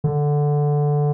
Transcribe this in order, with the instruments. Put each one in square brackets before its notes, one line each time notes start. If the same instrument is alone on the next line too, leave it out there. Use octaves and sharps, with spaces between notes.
[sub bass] D3